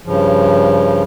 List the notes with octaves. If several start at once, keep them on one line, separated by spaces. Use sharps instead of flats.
G2 C#3 F3